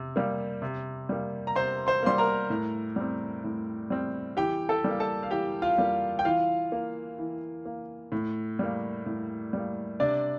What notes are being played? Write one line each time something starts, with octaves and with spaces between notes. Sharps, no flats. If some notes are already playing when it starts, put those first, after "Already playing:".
Already playing: C3
G3 A#3
C3
G3 A#3
A#5
C3 C5 C6
C5 C6
G3 A#3 C6
A#4 A#5
A2
G3 C4
A2
G3 C4
E3 G4 G5
A4 A5
G3 A#3
A4 A5
F5
E3 G4 G5
F4 F5
G3 A#3
G5
E3 F4 F5
A#3
E3
A#3
A2
G3 A#3
A2
G3 A#3
C3 D4 D5